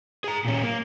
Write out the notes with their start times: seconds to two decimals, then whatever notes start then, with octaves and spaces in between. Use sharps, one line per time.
0.24 G#4 A#5
0.45 A#2 C#4
0.63 A#3